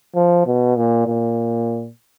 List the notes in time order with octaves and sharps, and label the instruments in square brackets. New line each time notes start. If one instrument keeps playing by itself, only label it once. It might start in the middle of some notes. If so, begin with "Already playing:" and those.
[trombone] F3
B2
A#2
A#2